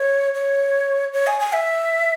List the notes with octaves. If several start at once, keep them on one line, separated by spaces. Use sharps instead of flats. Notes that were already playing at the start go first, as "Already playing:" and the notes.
Already playing: C#5
C#5
C#5
G#5
G#5
E5